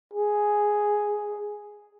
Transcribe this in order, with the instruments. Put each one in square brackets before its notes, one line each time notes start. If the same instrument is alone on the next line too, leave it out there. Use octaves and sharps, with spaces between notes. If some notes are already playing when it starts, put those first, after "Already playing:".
[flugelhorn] G#4